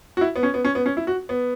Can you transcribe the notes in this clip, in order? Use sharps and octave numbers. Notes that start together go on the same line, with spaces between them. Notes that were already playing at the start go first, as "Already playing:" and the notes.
F#4
E4
B3
C#4
B3
C#4
B3
C#4
E4
F#4
B3